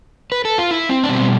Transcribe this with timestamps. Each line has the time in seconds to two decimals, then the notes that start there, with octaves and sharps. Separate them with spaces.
0.32 B4
0.45 A4
0.58 F4
0.71 E4
0.89 C4
1.04 D4
1.09 B2 G3 C4